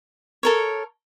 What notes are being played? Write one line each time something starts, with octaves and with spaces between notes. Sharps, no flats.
A4 A#4 C#5